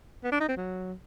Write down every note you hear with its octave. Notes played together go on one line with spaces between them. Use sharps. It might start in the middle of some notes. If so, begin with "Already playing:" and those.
B3
D4
D#4
C4
F#3